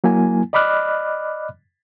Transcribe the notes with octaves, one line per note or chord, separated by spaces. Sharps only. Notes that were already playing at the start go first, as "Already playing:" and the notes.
F#3 A#3 E4 G#5
D5 D#5 B5 D6 F6 F#6